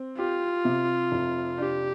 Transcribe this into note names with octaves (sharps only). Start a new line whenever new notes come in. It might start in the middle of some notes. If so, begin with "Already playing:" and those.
Already playing: C4
F4 G4
C3
F1
D4 G4